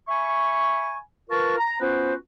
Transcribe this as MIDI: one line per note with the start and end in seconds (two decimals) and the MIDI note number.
0.08 0.97 76
0.08 0.97 80
0.08 0.97 83
0.08 0.97 85
1.29 1.58 65
1.29 1.58 70
1.29 1.58 71
1.29 1.58 77
1.29 1.58 81
1.29 1.58 85
1.58 1.79 82
1.81 2.14 59
1.81 2.14 61
1.81 2.14 65
1.81 2.14 66
1.81 2.14 71
1.81 2.14 72